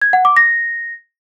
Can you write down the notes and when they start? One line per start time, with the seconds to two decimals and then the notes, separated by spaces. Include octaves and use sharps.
0.02 G#6
0.13 F#5
0.25 D6
0.37 A#6